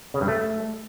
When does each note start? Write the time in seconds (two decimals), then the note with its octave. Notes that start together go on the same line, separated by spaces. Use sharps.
0.14 C#3
0.21 G2
0.28 A3